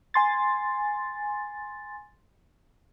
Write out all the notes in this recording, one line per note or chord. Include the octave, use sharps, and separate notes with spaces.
G#5 C6 A6